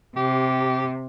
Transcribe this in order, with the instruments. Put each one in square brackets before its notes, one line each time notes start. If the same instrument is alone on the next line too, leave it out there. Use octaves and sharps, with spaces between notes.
[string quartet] C3 [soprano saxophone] G4